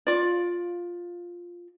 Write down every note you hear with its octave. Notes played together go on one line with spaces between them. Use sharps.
F4 D5